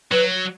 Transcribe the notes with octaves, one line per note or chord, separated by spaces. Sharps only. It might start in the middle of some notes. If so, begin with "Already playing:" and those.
F#3 B4